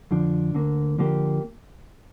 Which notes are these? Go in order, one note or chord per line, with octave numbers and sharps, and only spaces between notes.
F2 D3 F3 D4
D2 D3 A#3
D3 F3 A#3 G4